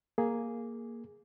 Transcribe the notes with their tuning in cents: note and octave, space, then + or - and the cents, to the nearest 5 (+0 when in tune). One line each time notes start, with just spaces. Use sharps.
A#3 +0 G#4 +0